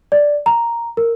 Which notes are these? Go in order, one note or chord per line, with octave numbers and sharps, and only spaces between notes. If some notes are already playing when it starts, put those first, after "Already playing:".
D5
A#5
A#4